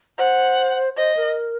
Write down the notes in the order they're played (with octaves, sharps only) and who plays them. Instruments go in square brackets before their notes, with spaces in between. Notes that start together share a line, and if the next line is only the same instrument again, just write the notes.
[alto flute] C5 [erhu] F#5
[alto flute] C5 [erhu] D#5
[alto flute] A#4